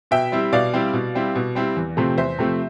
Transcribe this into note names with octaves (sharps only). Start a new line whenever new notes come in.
B2 E5 G5
G3 C4 E4
B2 D5 F5
G3 C4 E4
B2
G3 C4 E4
B2
G3 C4 E4
E2
C3 F3 A3 C4
E2 C5 E5
C3 F3 A3 C4